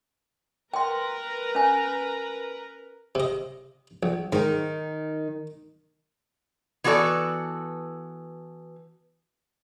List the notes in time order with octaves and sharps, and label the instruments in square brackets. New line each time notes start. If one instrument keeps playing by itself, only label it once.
[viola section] A#4 B4 A#5 [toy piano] G5 C6
[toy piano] C#4 G#5
[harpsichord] C3 D#5
A#1
[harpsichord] G#2 [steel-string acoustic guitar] D#3 D#4
[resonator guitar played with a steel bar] E3 B3 F#4 A4 D5